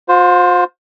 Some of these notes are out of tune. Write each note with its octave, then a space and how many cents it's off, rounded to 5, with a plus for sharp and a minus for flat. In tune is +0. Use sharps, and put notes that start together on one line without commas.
F4 +40 C5 +0